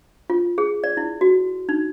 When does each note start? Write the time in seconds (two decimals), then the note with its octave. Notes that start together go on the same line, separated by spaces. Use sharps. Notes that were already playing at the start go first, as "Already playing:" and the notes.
0.30 F4
0.58 G#4
0.84 D5
0.97 E4
1.21 F#4
1.69 D#4